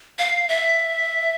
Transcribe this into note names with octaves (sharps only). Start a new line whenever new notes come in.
F5
E5